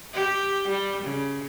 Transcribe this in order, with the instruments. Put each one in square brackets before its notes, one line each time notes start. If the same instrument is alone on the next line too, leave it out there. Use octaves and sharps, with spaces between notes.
[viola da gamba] G4
G3
C#3